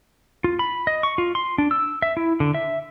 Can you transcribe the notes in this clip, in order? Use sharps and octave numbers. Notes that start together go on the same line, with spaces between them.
F4
B5
D#5
C#6
F4
C6
D4
E6
E5
E4
D3
E5